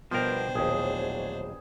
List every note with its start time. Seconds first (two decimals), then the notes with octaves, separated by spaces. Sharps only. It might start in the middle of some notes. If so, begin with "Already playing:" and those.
0.11 B2 F3 G3 B3 D4 A#4 C5 G5
0.55 A#1 D#2 A2 F#3 G#4 C#5